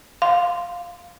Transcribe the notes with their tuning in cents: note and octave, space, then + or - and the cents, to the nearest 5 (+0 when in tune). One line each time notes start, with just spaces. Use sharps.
F5 +0 C6 -5